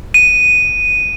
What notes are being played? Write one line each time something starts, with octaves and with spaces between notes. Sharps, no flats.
D#7